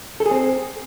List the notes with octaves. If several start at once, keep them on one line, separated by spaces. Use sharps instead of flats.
A4
G#4
C4